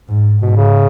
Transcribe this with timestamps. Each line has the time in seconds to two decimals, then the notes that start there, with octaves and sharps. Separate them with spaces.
0.09 G#2
0.41 G#2 B2
0.56 C#3